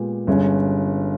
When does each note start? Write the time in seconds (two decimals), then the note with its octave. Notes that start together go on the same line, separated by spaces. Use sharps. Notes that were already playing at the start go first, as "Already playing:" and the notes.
Already playing: A#2 G#3 B3 G4
0.27 G1 G2 G3 C#4 G#4